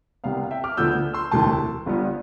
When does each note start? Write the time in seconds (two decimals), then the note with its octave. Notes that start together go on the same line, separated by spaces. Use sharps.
0.24 C2 C3 G3 B3 F5
0.37 F5
0.51 E5 G5
0.64 D6 F6
0.77 D2 D3 F3 B3 E6 G6
1.14 C6 E6
1.31 E1 D2 C3 E3 A5 C6
1.86 G1 G2 F3 B3